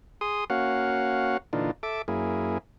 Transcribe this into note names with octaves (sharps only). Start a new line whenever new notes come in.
G#4 C6 D#6
A#3 C#4 F#4 F5 F#5
A#2 D3 E3 D4 D#4 F4
A4 E5 D6
F#2 A#3 E4 G#4